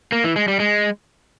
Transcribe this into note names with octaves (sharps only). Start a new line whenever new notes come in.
A#3
E3
G#3
G3
G#3